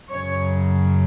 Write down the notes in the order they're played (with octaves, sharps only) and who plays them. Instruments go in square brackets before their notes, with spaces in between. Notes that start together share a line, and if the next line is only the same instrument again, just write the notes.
[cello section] F#2 C#3 F#3 C#5